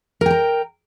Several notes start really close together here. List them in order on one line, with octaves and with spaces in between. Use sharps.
A#4 G5 A#5